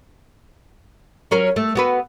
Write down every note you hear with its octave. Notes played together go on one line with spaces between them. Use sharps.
F#3 C#4 A#4
A3
B3 F#4 B4